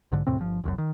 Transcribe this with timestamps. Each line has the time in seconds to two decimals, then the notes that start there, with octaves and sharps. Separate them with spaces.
0.12 B1 G#2 D3
0.27 E2 A2 C3 C4
0.39 G1 F3
0.64 E1 C2 F#2
0.78 D#3